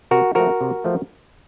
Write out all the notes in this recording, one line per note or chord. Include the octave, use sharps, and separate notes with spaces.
C3 F#4 A#4
F3 A3 F#4 A#4
C3
F3 A3